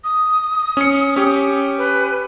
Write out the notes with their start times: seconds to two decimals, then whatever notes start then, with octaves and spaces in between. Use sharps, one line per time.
0.04 D#6
0.77 C#4 C#7
1.16 C#4 G4
1.78 B4